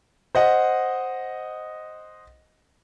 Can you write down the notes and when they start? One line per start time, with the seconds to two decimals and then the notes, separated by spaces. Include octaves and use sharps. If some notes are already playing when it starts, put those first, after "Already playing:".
0.35 C5 D#5 F#5